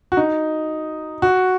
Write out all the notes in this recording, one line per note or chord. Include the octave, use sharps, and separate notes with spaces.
F#4
D#4
F#4